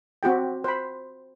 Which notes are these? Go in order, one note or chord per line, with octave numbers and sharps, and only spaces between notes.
C4 F#4 G4 G5
C5 B5